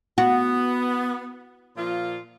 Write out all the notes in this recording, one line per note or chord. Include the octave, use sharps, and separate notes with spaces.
B3 F#4
A#2 F3 F4